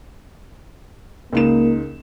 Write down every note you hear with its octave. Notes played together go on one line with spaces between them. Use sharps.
C#2 A#3 D#4 E7